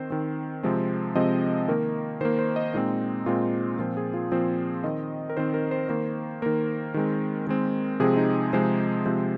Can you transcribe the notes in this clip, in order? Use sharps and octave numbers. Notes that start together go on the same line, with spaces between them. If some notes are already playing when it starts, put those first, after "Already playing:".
Already playing: D#3 C4 C5
D#3 C4
C3 F3 G#3 C4
C3 F3 G#3 C4 D#5
D#3 A#3 A#4
D#3 A#3 C5
C5
D#5
A#2 G#3 C4 D#4
A#2 G#3 C4 F4
A#2 F3 C4 F4
G#4
F4
A#2 F3 C4 C5
D#3 C4 D#5
A#4
D#3 C4 C5
A#4
C5
D#3 A#3 C5
D#3 A#3 A#4
D#3 G#3 C4
D#3 G#3 C4
C3 F3 G#3 C4 G#4
D#4
C3 F3 G#3 C4 C5
C3 F3 G#3 C4